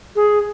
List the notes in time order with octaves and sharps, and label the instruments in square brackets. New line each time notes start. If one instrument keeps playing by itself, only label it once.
[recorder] G#4